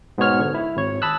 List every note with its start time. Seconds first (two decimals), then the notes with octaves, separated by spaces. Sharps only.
0.18 G#2 B2 B3 C#5 F6
0.40 D3
0.54 E4
0.76 G#1 C#5
1.02 A5 B5 D#6 E6 F#6